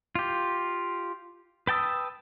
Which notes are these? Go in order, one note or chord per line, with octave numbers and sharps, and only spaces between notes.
F4 G4
B4 G5 A5 D#6 E6